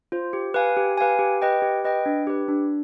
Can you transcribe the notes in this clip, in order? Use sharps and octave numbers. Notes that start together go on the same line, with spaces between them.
F4 C5
G4
B4 F5 G#5
G4
B4 F5 G#5
G4
B4 D#5 G5
G4
B4 D#5 G5
D4
G4 B4
D4